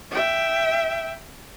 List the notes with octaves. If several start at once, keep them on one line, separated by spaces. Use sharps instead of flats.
E5 G5